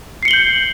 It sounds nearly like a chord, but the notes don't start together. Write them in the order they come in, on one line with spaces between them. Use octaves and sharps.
C7 C#7 G7 F#7 G6